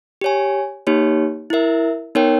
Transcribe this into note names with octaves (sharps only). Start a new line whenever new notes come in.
G4 C#5 G#5
A#3 D#4 G4 C#5
E4 A#4 E5
B3 D#4 A#4 C#5 G5